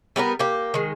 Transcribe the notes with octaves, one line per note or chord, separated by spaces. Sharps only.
G3 B3 D4 A#4
A#3 G4
D#3 G#3